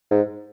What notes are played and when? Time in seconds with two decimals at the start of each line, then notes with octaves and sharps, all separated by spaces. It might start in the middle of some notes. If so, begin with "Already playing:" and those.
0.11 G#2